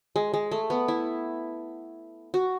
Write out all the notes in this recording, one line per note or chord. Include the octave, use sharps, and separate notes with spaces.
G#3
G#3
A3
B3
E4
F#4